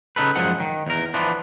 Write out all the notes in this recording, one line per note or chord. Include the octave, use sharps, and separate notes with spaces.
C#3 D#4 A4 B4
F#2 F3 G#3 G#4 F#5
D#3
E2 A#4
E3 F3 B3 D4